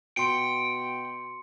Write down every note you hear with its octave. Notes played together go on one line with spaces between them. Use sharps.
B2 G5 C6 C#7